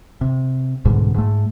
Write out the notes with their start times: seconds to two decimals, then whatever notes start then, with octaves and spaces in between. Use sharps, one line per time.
0.21 C3
0.85 C2 G#2 B2 D3
1.15 G#2 A3